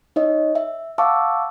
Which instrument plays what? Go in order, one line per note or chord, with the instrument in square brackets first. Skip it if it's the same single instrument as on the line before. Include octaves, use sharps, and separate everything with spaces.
[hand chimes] D#4 C#5 D#5
E5
F5 F#5 A5 C#6 D6 E6